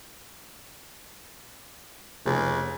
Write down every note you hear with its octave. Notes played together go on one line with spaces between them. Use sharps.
F1 C#2